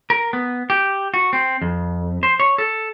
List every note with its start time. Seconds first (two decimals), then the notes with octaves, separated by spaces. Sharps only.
0.10 A#4
0.33 B3
0.70 G4
1.14 F#4
1.33 C4
1.62 F2
2.23 C5
2.40 C#5
2.58 A4